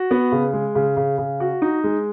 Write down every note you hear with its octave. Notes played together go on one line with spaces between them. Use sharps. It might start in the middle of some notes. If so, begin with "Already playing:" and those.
Already playing: F#4
B3
C#3
G#3
C#3
C#3
C#3
F#4
D#4
G#3